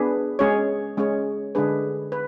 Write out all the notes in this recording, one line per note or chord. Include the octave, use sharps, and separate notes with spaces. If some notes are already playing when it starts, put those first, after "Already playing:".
Already playing: B3 D4 G#4 B4
G#3 C#4 G#4 C#5
G#3 C#4 G#4 C#5
D3 G#3 D4 G#4 B4
B4